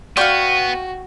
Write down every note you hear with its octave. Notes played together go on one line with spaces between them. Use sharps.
B3 F#4 D5 F5 G5 C#6